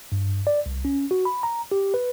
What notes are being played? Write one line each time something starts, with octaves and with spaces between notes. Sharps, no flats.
G2
D5
C2
C#4
F#4
B5
A#5
G4
B4